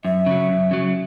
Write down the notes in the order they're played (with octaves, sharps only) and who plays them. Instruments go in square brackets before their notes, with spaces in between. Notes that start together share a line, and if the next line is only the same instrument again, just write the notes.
[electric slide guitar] F#2 [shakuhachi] E5
[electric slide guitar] C#3 F#3
F#2
C#3 F#3